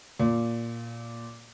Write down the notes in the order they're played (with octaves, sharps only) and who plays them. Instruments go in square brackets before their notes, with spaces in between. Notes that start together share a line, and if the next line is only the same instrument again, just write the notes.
[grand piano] A#2